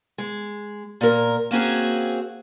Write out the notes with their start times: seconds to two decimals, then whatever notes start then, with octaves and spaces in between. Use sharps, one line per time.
0.18 G#3
1.01 A#2 A#4
1.51 A#3 C4 C#4 F#4 G#4